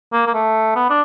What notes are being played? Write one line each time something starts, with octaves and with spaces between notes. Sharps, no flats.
A#3
A#3
A3
B3
D4